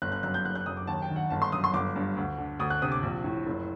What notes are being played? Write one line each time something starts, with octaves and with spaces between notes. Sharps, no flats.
G1 F#6
F#6
F#2 F#6
G6
F#1 F#6
F#6
F#2 D#6
D6
D#2 A5
G5
D#3
F#5
G1 A5
C6
F#2 D#6
C6
G1 D6
G2
D2
D3
D2 D#6
F#6
C3 D#6
D6
A#1
A2
F#1